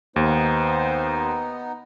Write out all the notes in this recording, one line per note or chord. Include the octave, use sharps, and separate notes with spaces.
D#2 B3 D#4 C5